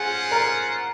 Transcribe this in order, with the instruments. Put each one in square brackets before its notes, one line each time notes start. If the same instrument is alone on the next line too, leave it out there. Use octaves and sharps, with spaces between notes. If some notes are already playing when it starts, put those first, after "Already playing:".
Already playing: [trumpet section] C#4 F4 C5 F#5 [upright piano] G#4
[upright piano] A#4